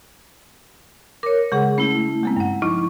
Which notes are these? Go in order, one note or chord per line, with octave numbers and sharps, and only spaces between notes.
A#4 C#5 D6
C#3 G#3 G#4 F#5
A3 C#4 E4
G#3 A#3 C4
G2 F#5
F3 D#4 E4 C#6